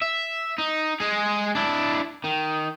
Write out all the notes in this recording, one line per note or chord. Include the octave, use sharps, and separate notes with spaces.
E5
D#4
G#3 G#4
D4 E4
D#3